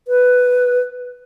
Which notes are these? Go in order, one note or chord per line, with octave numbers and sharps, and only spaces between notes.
B4